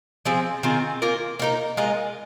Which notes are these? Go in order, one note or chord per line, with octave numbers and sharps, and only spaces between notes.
F3 C4 G#4
D#3 C4 F4 G#4
A#3 F4 A#4
A#3 D#4 A#4
G#3 F4 A#4 D#5